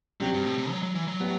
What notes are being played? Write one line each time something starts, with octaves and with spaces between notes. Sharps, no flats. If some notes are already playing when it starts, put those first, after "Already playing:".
C3 F#3 G3 C4 G4
G2
A2
C3
F#3
F#3
E3
F#3
A2 G3 B3